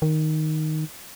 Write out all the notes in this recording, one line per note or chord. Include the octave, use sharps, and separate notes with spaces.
D#3